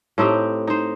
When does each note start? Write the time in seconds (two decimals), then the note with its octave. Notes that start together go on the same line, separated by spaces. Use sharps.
0.18 A2 C4 D#4 G4
0.67 D#4 C5